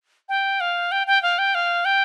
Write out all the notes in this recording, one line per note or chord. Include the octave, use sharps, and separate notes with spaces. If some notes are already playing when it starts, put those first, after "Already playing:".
G5
F5
G5
G5
F5
G5
F5
G5